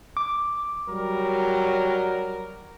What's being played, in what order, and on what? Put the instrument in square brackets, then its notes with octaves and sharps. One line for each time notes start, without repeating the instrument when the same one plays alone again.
[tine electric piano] D6
[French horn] F#3 [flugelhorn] G3 [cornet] A#4